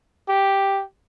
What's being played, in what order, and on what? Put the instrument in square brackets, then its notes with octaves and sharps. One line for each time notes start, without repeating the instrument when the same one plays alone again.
[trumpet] G4